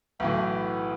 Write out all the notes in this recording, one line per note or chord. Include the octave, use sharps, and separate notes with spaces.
B1 A2 E3 B3
A3
B3